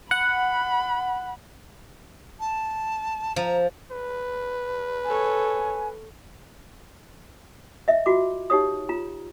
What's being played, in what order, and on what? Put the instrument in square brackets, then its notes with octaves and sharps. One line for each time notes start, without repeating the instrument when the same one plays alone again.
[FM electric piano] F#5 [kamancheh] B5
[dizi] A5
[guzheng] F3 [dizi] A#5
[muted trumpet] B4
[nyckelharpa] A4 C#5 [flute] G#5
[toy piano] D#5 E5
F4 F#4 D6
D#4 G4 C#5 D#6
F4 A#5